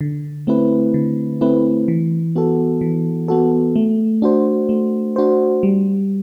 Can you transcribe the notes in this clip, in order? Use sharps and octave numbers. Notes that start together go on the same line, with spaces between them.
D3
A3 C4 E4 B4
D3
A3 C4 E4 B4
E3
B3 F#4 A4
E3
B3 F#4 A4
A3
D4 F#4 C5
A3
D4 F#4 C5
G3